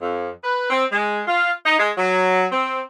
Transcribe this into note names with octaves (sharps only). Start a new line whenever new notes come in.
F2
B4
C4
G#3
F4
D#4
G#3
F#3
C4